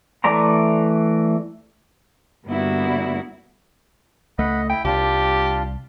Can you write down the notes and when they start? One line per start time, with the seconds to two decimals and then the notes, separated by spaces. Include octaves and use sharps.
0.24 E3 A3 D5 A#5 C6
2.45 G2 D3 A#3 B3 E4 F#4
4.39 C#2 A3 D#5 F#5 B5
4.69 E4 G5 B5
4.85 C2 D4 F4 G4